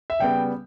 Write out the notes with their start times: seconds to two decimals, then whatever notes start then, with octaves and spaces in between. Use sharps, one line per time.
0.10 E5
0.19 C#3 G3 B3 G5